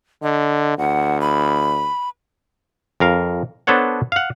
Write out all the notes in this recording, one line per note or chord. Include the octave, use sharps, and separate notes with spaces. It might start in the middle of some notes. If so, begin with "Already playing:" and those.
D3 D#5
D2 F#5
B5
F2 A#4 F5
B3 D4 A4 C5 C#5 F#5
F5 F#5